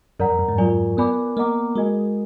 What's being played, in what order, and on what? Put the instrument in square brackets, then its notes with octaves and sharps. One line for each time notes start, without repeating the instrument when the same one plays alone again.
[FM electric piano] F#2 [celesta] A#4 D5 F#5 A#5
[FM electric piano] F2
F#2
G#2
[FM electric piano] F#3 [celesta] F4 A#4 D5 G#5
[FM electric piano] B3 [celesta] A#4 D5 G#5 B5 D6
[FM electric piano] A#3 [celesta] A#4 D#5 F#5 A#5 D6
[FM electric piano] G#3 [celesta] F#4 A#4 D#5 G#5